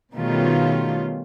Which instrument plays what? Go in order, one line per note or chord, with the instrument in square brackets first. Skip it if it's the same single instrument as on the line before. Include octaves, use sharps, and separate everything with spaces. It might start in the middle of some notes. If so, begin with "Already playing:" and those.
[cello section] B2 D#3 G3 A3 C#4 F4